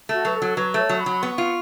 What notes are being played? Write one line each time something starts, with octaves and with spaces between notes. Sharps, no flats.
A3 F#4
F#3 B4
A4
F#3
F#3 B4
A3 C#5
F#3
C#6
B5
F#3
B3 C#6
F4